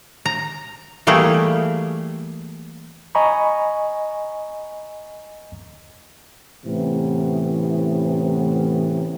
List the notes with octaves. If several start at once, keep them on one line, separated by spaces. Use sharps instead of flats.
A#5
E3 G3 A3 A#3 G#4
D#5 G#5 A#5 B5 C#6
A2 C3 E3 B3 C#4